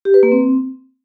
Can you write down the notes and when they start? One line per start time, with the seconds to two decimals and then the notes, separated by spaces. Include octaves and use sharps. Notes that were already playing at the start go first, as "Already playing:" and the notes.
0.05 G4
0.14 B4
0.23 A#3
0.32 C4